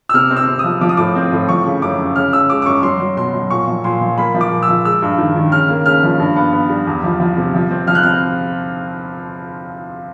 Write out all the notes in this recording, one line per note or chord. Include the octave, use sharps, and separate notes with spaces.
E6
C3 F6
C4
E6
C4
F3 D#6
F3 D6
D#6
A2 D6
C4
A2
F3 C#6
C#3
F#2 D6
C#3
C#3 F6
C#3 E6
G#3 D6
D6
F#2 C#6
F#3 C6
F#3
B2 C6
F#3
A#2 C#6
F3
A#2 C6
F3
A#3 B5
F3
D6
A#2
E6
F3
G#3 E6
G2
D#3
D#3
C#3 F6
A#3
C#3 F6
F3
G2
B3
B3
G3
E2
F3
F3
C3
F3
C4
F3 F6
F#6
C4 F6